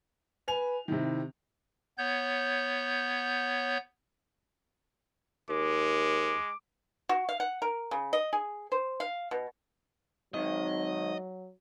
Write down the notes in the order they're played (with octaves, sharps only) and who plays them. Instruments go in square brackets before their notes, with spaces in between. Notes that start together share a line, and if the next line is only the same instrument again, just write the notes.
[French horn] B4 [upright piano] G#5 F7
[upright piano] C3 D#3 [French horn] E4
[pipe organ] B3 C#5 G6
[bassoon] D#2 [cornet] G#3 [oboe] D6
[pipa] F#4
F5
F#5
A#4
C#3
D#5
G#4
C5
F5
B2
[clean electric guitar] G#2 D#3 [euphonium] F#3 [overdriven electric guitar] D#5